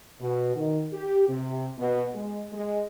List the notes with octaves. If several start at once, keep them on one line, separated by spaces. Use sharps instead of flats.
B2
D#3
G4
C3
B2
G#3
G#3